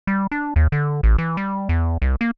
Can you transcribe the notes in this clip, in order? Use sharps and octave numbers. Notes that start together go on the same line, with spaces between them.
G3
D4
D#2
D3
A1
E3
G3
E2
C2
A#3